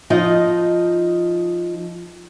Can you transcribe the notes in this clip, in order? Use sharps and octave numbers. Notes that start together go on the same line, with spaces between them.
F3 D#4 D#5